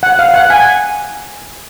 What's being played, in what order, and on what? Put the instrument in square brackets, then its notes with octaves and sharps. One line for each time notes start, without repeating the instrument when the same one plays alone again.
[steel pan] F#5
F5
F#5
G#5